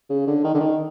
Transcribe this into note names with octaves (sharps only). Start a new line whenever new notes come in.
C#3
D3
D#3
D3
D#3